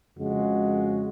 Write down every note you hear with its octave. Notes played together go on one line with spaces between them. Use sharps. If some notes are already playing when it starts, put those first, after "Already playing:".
F2 C#3 G#3 F#4